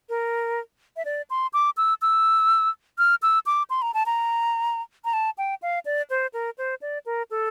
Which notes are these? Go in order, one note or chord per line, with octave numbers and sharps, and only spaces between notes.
A#4
E5
D5
C6
D6
E6
E6
F6
E6
D6
C6
A#5
A5
A#5
A#5
A5
G5
F5
D5
C5
A#4
C5
D5
A#4
A4